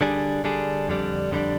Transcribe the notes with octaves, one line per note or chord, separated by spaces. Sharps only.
D3 G3 D4 G#4
D3 G3 D4 G#4
F2 D3 G3 D4
F2 D3 G3 D4